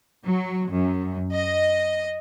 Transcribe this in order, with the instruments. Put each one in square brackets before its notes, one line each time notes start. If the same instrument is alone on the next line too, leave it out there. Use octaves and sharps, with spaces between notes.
[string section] F#3
F#2
D#5